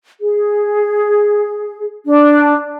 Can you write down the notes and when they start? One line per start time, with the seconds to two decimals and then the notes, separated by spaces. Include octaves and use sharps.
0.21 G#4
2.07 D4